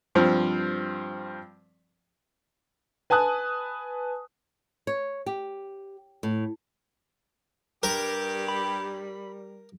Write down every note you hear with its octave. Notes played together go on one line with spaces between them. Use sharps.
G2 F3 C4
B4 G#5 A5 D#6 F#6
C#5
G4
A2
G2 G3 G4 A#4
B5